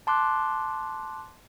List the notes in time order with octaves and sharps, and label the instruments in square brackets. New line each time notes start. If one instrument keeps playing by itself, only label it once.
[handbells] A5 C6 D6 F#6